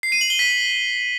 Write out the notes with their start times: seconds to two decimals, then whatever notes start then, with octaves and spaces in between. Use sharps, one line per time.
0.03 C7
0.12 D#7
0.21 F#7
0.30 G7
0.39 B6